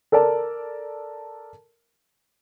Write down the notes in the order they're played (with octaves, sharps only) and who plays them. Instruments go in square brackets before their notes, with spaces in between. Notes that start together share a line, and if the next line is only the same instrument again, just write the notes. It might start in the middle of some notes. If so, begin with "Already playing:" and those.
[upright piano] A4 A#4 D5 A5